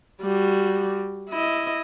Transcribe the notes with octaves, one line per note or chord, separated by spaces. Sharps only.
G3 F#4
E4 D#5